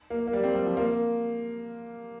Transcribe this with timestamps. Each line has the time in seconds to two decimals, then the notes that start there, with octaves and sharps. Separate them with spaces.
0.10 A#3
0.27 A#3
0.33 G3
0.44 C4
0.55 G3
0.67 F3
0.77 A#3